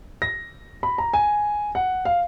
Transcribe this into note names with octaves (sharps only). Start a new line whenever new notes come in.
A#6
B5
A#5
G#5
F#5
F5